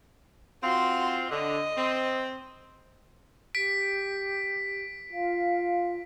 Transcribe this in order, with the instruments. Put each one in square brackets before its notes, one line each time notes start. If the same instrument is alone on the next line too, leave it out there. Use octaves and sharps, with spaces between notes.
[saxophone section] C4 F4 [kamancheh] F#4 C6
[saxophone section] D3 [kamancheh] D#5
[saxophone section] C4
[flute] G4 [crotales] B6 D7
[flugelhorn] F4 [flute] F5